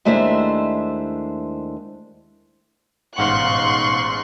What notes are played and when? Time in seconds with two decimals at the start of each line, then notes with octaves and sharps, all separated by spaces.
0.05 D#2 G#3 A3 D4 E4 C5
3.18 A1 G#2 B2 F5 F#5 C6 C#6 F#6